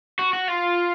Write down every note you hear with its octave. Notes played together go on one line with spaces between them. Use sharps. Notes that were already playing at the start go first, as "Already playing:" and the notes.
F#4
F#4
F4